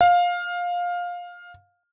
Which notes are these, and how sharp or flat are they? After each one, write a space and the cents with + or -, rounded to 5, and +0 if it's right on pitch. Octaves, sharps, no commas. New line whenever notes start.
F5 +15